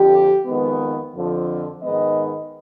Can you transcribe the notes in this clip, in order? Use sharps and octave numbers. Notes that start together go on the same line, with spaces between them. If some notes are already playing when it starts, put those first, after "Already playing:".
Already playing: F2 D3 F3 G4
F2 D#3 G#3 B3
F2 D3 F3
G#2 D#3 G#3 B3 D#5